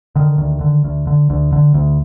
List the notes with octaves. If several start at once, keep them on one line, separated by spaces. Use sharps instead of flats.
D3 D#3
D2
D3
D2
D3
D2
D3
D2